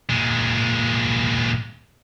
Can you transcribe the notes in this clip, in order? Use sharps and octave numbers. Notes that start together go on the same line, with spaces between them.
A#2 G#3